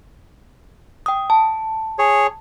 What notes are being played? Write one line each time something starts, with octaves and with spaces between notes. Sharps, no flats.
G5 D#6
A5
G#4 C#5